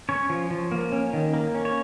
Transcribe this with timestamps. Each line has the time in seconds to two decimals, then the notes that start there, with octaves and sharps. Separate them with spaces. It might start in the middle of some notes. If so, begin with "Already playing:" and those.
0.09 C#4 C#5
0.29 F3
0.51 F3
0.71 A#3
0.92 C#4
1.13 D#3
1.34 A#3
1.55 C#4
1.65 C#5